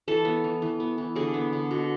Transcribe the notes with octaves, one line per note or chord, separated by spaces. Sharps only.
E3 A4
B3
E3
E3
B3
E3
D3 G#4
B3
D3
B2